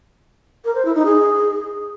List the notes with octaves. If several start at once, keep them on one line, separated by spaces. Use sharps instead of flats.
A#4
C5
E4
D#4
G#4